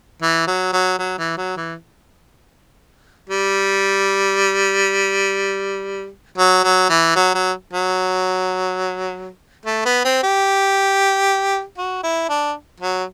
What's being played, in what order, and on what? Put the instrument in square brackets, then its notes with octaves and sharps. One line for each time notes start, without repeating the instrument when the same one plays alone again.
[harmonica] E3
F#3
F#3
F#3
E3
F#3
E3
G3
F#3
F#3
E3
F#3
F#3
F#3
A3
B3
C4
G4
F#4
E4
D4
F#3